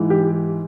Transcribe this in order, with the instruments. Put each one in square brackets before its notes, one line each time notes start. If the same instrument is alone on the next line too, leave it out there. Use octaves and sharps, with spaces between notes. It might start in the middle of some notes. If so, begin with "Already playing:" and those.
Already playing: [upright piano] G#2 E3
G4